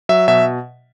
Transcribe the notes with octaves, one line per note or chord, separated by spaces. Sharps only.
F#3 E5
B2 E5